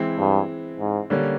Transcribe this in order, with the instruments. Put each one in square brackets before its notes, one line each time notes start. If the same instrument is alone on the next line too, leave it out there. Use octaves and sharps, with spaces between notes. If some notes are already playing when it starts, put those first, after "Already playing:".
Already playing: [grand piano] E3 G#3 C4 E4
[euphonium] G2
G#2
[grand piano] D3 G3 A#3 C#4